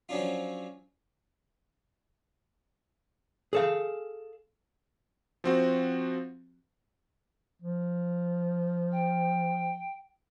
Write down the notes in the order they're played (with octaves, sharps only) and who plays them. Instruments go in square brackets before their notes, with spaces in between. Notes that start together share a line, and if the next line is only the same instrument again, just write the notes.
[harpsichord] F3 F#3 C#4 D4 F4
[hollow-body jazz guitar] G#4 A4 F5
[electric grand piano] F3 C4 F#4
[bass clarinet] F3
[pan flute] G5